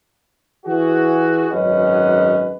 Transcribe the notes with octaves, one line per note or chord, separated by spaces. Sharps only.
E3 F#4 G#4
G#1 F#2 C#4 B4 D#5 F#5